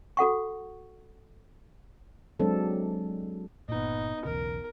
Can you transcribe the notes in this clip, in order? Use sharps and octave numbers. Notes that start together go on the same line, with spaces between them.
F#4 A4 F#5 C#6
F#3 G#3 C4 D4 A4
G1 A#2 B3 D#4
B1 E2 C#3 A#4